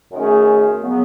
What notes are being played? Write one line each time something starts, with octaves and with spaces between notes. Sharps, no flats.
F#2 D#3 A3 C#4 G#4
C#3 F#3 B3